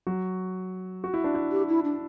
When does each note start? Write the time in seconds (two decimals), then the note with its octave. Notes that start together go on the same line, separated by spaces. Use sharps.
0.07 F#3 F#4
1.04 F#4
1.14 E4
1.24 D4
1.35 E4
1.51 G4
1.68 E4
1.84 D4